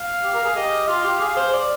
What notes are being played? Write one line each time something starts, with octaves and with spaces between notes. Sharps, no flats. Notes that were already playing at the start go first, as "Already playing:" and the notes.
Already playing: F5
G4
A#4
G#4
G4 D#5
F4 F5
G4
G#4 F5
C5
D5